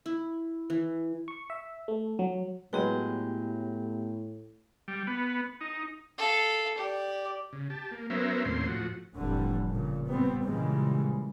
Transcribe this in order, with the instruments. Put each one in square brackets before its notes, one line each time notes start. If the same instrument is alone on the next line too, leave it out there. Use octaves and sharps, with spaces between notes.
[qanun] E4
E3
[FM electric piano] C#6
E5
A3
F#3
[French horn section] A2 [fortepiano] F#3 G#3 B4 [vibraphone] B3 G4 G5
[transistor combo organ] G3
B3
D#4
[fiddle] A4 F5
G4 D5
[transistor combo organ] C#3
G4 A5
A#3
F#3 B3 C#4 A#4 C5 E5
D#2 A2 A#3 C4 C#4 C6
A2 F3 F#4
[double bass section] F1 A2 D3 E3 G3
A#2 C#3
G3 B3 C4
A#2 C#3 E3 G3 G#3